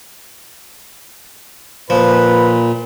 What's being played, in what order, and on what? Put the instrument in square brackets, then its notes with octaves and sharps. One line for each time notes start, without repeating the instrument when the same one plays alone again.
[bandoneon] A#2 [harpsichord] F3 [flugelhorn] B4